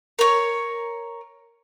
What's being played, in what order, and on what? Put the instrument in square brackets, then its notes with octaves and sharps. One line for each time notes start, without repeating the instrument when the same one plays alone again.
[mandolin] A#4 C#5